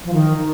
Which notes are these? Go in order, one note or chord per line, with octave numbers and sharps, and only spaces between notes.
F3
D#3